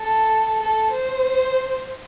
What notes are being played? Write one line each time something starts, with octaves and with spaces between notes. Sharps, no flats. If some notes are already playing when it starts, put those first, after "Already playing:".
Already playing: A4
A4
C5